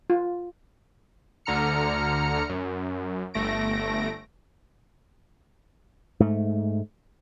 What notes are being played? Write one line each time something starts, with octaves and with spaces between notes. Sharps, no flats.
F4
D2 D3 A#5 F6 C#7
F#2
G1 A3 A#6 D7
G#2 A3